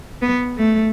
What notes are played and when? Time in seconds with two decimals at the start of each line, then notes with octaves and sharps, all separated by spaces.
0.22 B3
0.57 A3